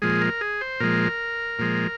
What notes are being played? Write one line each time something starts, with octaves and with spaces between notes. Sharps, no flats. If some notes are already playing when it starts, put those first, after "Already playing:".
A#2 F3 G#3 G#4
A#4
G#4
C5
A#2 F3 G#3 A#4
A#2 F3 G#3